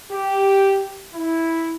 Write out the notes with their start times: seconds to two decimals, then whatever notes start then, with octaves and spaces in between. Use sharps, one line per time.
0.12 G4
1.15 E4